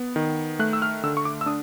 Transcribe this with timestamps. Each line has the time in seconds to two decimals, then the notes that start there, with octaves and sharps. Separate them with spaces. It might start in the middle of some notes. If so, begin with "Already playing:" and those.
Already playing: B3
0.16 D#3
0.59 A3 F#6
0.73 E6
0.82 F6
1.03 D3 E6
1.17 C#6
1.25 D6
1.41 E6
1.46 D4 D#6